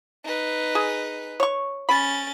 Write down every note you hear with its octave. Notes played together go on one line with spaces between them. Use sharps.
D#4 B4
G#4
C#5 C#6
C#4 B5 A6